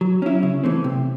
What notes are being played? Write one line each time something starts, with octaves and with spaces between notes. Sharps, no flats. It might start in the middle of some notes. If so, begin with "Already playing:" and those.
F#3
C#4 E4
C#3
E3 A3 C4
C3